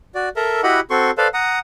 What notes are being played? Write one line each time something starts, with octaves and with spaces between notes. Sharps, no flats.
F#4 D5
A4 A#4 E5 A#5
E4 F#4 G4 D#5 F#5 B5
C4 F#4 A4 C6 C#6
A4 B4 C5 D5 F5
F#5 A#5 D#6